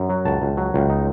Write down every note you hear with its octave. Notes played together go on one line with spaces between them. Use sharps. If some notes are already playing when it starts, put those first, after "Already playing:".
Already playing: F#2
F#3
C#2 A5
C#2
F#3
C#2
D#4